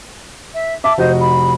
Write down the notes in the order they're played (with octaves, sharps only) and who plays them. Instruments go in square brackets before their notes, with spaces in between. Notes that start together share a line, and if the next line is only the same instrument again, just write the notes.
[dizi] E5
[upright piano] E5 A5 [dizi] D6
[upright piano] F1 F#4 D#5 [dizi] C5
[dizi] B5